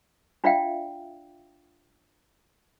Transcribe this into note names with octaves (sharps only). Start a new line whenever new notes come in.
D4 F4 D5 E5 F5 G5